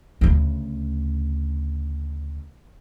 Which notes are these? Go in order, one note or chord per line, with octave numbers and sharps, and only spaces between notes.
D2 C#3